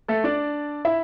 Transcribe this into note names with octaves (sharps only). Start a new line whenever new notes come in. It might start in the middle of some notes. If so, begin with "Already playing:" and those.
A3 A4
D4 D5
E4 E5